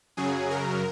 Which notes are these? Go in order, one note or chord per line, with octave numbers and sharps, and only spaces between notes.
F#2 C#3 F#3 G#4
A#4